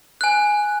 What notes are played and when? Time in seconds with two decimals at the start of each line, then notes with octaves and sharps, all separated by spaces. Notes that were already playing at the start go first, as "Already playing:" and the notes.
0.21 G#5 F#6